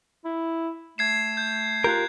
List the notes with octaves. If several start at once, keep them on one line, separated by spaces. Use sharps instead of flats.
E4
A3 G#6 C7 E7
G6
F4 G4 A#4 F#6 G6